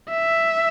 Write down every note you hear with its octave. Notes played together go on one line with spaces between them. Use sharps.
E5